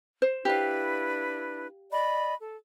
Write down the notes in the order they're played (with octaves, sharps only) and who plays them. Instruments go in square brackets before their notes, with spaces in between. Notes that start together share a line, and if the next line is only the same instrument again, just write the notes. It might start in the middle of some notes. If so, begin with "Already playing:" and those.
[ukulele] C5
[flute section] D4 E4 B4 [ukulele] G4 F5
[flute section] D5 D#5 B5
A4